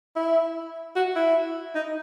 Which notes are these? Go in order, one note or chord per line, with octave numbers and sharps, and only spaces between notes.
E4
F#4
E4
D#4